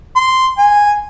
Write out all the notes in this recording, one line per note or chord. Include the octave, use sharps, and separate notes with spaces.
C6
G#5